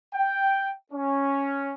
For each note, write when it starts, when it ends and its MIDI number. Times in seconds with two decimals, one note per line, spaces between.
0.15 0.70 79
0.92 1.74 61